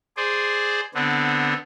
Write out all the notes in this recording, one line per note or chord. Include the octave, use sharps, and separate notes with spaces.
G#4 C5 D5
D3 B3 C4 D4